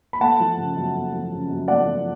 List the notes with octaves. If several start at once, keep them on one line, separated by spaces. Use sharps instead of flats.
B5
A3 F#5 A5
F3
C#3
F#2
A3
F3
C#3
F#2
A3 D5 F#5
F3